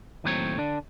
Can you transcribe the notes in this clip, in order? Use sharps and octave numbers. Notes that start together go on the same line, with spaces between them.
D#2 A2 F#3 C4 B4 C#5
D3 D4